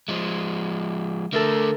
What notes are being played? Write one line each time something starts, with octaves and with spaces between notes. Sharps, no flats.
F3 G#3
D3 A3 A4 A#4